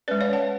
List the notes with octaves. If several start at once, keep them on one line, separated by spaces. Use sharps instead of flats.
G#3 C#4 B4 D5
C#5 F5
F#5 A5